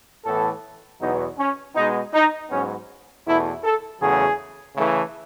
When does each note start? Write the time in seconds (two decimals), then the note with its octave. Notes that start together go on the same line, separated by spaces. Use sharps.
0.24 A2 E3 B3 A4
1.00 E2 B2 F#3 B3 D#4
1.38 C#4
1.75 B2 G#3 B3 D#4
2.13 D#4
2.50 G#2 F#3 B3 C#4
3.25 E2 B2 A3 E4
3.63 A4
4.00 E2 C#3 F#3 A3 G#4
4.75 C#3 E3 A3